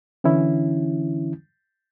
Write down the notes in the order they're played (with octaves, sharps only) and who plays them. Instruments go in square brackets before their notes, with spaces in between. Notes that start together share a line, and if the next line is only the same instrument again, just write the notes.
[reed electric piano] D3 E3 C#4 E4